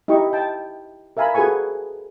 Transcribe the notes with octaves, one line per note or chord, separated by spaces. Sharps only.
D#4 E4 G4 D#5 C#6
G5 A5
A#4 E5 F5 G#5 A#5 B5
F#4 G#4 A4 B4 G#5 C#6